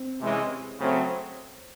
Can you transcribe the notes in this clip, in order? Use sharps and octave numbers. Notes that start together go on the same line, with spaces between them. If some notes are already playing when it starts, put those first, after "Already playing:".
Already playing: C4
C3 E3 G#3 C#4 E4
C#3 F#3 A3 C4